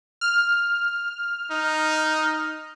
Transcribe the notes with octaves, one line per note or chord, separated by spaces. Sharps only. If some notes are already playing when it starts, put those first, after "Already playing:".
F6
D#4